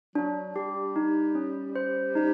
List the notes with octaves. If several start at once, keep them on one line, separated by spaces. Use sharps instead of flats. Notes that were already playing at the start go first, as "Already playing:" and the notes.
F#3 D4
G3 G4
D#4
C#4
C5
G3 D#4